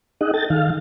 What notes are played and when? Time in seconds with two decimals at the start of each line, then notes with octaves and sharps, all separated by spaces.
0.21 D#4 G#4 D#5 F#5
0.34 A4 G5 A6
0.50 D#3 F5